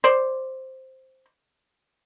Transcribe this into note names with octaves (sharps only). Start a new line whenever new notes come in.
C5 D5